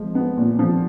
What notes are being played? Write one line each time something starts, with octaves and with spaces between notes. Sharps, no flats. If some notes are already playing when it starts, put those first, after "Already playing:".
Already playing: F3 G#3
B3
A#2
F3